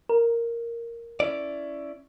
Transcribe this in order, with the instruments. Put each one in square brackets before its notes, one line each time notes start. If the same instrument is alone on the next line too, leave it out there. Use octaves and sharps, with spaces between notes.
[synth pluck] A#4
[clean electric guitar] C#4 E4 D5